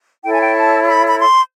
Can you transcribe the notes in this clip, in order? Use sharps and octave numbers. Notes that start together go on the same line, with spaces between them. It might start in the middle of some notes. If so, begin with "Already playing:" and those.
E4 A4 C#5 G5
G#5
G5
A5
B5
B5
C6